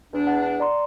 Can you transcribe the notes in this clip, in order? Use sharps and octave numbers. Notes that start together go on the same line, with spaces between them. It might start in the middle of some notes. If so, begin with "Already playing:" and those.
E2 D4
F#5
D5 A#5 C6